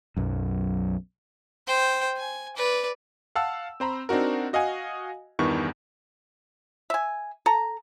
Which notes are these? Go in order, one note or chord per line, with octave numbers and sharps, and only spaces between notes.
B1 F#2
C5 G5
G#5
B4 D5
F5 F#5 A5 E6
C4 C5 A#5 B5
C4 D4 D#4 F#4 A#4
F#4 D#5 F5 F#5 G#5
E2 G2 D#3 E3 B3 C#6
E5 G#5
A4 A#5